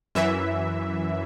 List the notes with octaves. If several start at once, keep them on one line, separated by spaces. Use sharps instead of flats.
F#2 E3 E5